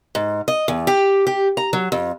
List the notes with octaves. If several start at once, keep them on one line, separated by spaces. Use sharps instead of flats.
G#2
D#5
E2
G4
G4
A#5
F#3
F2